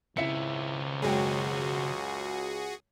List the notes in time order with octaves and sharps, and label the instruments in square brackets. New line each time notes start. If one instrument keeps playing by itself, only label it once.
[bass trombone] C#2 [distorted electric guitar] C#3 C4 [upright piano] E4 E5 C#7
[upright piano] F#2 G#3 G5 [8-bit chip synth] F#4 G#4